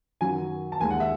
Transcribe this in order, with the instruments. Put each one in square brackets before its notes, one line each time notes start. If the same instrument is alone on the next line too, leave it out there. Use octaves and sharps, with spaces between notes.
[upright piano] F#2 D#3 F#3 G#5
A5
D#2 D#3 G#3 G#5
F#5
E5